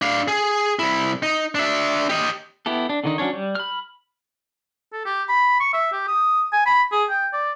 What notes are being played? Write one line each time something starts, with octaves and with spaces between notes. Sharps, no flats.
D4 F5
G#4
C2 E4
D#4
D4 E5
G4 D#5
B3 E4 G4 A4
D4
D3 D#3 D#4
F#3 C#4 D4 C#5
G3
B5 F6
A4
G4
B5
C#6
E5
G4
D#6
G#5
B5
G#4
G5
D5